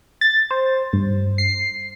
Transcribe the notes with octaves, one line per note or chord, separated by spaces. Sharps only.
A6
C5
G2
C7